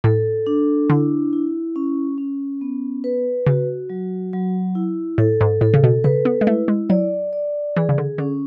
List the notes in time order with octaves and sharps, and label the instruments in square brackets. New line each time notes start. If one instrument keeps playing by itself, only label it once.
[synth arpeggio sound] A2 [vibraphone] A4
[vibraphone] D4
[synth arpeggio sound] D3 [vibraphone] E4
[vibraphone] E4
C#4
C#4
B3
B4
[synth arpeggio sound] C#3 [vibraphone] F#4
[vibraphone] F#3
F#3
E4
[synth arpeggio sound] A2 [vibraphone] A4
[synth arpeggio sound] G#2
[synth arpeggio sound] A2 [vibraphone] A4
[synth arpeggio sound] C#3
B2
[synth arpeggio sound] C#3 [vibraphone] B4
[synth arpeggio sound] B3
G#3
[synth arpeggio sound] A3 [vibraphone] E4
[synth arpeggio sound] G#3
[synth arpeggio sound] F#3 [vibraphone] D5
[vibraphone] D5
[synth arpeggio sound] E3 [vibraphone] G#4
[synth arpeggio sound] C#3
D3
[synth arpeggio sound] D3 [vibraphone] C#4